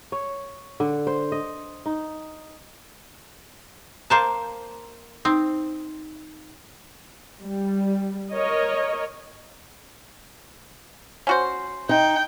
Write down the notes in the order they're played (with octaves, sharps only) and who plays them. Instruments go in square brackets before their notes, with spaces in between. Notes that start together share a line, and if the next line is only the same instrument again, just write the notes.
[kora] C#5
D3
C5
D#5
D#4
[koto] A#3 C5 A5 [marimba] A#5
[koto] C4 [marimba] D#4
[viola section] G3
A#4 C#5 D#5
[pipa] C#4 F#4 C5
[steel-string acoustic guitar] D#4 [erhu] G5